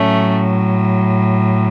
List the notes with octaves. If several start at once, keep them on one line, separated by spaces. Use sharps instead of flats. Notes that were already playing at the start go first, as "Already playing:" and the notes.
Already playing: A2 F#3 A3 C#4